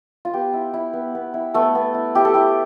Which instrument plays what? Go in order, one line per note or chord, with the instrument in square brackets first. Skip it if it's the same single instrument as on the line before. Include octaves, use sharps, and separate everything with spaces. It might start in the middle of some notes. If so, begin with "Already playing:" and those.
[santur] F4
B3 G4
E4
E4
B3
B3
E4
A3 B3 A4
B3
E4
E4 G4
A4
E4 G4